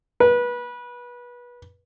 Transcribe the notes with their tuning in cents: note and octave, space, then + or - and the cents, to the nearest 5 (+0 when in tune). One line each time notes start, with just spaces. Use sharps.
B4 -25